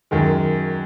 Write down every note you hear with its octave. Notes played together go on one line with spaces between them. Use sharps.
F#2 D#3 G#3